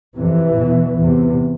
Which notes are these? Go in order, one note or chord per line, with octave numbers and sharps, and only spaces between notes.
F2 C3 E3
E2 B2
E2 C3